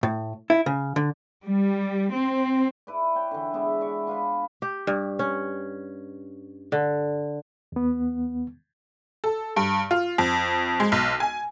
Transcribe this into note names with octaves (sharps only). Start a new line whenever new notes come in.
A2
E4
C#3
D3
G3
C4
E4 B4 D5
C#5 G5
D3 E3
G#3 B3 D5 E5
D5 E5 C#6
D4 F4 B4 B5
G4
G2
C#4
D3
E2 B3
A4
G2
F4
F2
G#3
B1
G#5